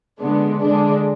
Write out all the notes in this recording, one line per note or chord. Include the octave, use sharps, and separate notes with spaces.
D3 G#3 B3 D4
D3 G#3 D4